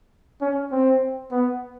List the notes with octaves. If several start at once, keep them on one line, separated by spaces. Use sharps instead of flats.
C#4
C4
B3